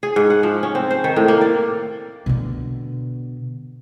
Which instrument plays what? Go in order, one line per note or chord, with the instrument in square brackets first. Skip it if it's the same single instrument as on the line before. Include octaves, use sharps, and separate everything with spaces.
[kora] G#4
G#2
F#5
F3
C#4
C4
C5
D#3
A2
A#3
D5
[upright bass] B2 D3